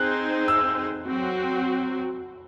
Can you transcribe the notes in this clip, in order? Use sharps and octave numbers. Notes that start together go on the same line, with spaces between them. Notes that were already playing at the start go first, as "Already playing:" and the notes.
Already playing: C4 D#4 G#4 C5 F#6
E6
F#3 C4 F#4